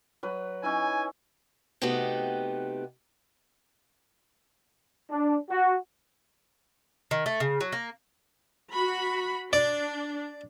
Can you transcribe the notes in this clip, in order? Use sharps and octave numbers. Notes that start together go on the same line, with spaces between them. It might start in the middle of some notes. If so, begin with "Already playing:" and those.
F#3 B4
C#4 D#4 E4 G#5
C3 A3 B3 D#4 F#4 G4
D4
F#4
D#3
A3
C#3
F#3
A#3
F#4 B5
D4 D5